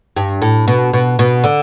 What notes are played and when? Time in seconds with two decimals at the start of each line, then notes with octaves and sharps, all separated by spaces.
0.17 G2
0.42 A2
0.68 B2
0.93 B2
1.19 B2
1.44 D3